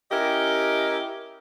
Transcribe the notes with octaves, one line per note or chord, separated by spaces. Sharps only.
C#4 E4 G4 A#4 D#5